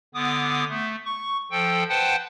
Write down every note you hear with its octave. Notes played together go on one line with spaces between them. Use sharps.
D3 B3 D6 D#6
A3
C#6
F3 A4 G5
B4 C5 F#5 G5 A5